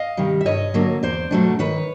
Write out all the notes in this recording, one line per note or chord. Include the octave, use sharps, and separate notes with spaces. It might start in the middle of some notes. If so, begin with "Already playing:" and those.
Already playing: D#5 F5
C3 D#3 G3
E5
G2 C#5 D#5
D3 F#3 A#3
E2 C5 D5
B2 F#3 A3 D4
D#3 B4 C#5